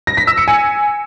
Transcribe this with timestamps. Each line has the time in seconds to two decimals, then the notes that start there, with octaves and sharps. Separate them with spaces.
0.07 A#6
0.17 B6
0.27 E6
0.37 C#7
0.48 G#5